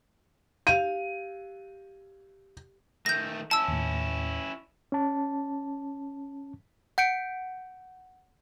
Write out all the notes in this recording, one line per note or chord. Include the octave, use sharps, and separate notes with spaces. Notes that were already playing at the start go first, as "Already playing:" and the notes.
G4 F5 D#7
D#3 A3 G6 A#6
C#4 E4 A5 E6
D#2 A2
C#4 A5
F#5 G6 C#7 D7